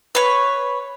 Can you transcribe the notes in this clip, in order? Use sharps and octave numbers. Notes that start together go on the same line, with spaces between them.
B4 C#5